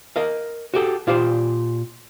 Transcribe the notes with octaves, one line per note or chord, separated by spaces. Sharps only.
A#4 D#5 F5
F#4 G4 A4
A#2 F4 G4 C5